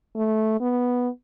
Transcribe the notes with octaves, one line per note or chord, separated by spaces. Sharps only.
A3
B3